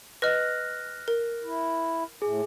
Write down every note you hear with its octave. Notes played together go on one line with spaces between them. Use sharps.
B4 D#5 F6 F#6 A#6
A#4
E4
A2 G#4